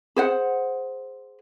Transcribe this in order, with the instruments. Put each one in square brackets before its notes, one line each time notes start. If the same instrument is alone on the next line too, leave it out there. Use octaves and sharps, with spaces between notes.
[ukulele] G#4 C5 F#5